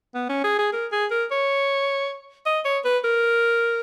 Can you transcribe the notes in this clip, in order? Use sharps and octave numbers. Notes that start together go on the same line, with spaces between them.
B3
C#4
G#4
G#4
A#4
G#4
A#4
C#5
D#5
C#5
B4
A#4